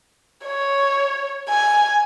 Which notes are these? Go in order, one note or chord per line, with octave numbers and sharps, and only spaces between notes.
C#5
G#5